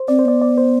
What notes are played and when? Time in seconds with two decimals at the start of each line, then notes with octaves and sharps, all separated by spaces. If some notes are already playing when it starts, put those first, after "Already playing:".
Already playing: C5
0.08 C4 D5
0.19 C5
0.25 B3 D5
0.42 D5
0.58 C5